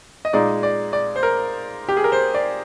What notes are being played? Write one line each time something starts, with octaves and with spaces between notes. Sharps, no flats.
D#5
A#2 G#3 D#4 D5
D5
D5
C5
A#4
G4
G#4
A#4
C5
D5